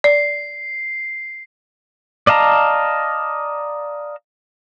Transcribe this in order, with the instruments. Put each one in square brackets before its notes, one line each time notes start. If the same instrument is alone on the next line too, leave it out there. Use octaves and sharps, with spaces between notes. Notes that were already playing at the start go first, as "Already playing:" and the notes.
[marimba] D5 [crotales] C7
[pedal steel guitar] D5 D#5 F5 A5 A#5